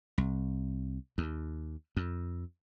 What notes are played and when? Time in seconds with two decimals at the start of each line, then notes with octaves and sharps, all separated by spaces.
0.18 C2
1.18 D#2
1.97 F2